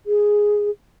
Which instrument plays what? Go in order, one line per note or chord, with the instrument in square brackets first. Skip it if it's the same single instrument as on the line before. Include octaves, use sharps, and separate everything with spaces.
[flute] G#4